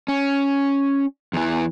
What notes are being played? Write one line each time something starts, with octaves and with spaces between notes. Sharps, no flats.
C#4
E2 E3